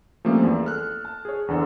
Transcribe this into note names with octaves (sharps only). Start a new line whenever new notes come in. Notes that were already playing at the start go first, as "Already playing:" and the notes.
F3 G3 A3 A#3 C4 C#4
E2
A4 F6 F#6
A5
G#4 C#5
E2 D3 A4 C5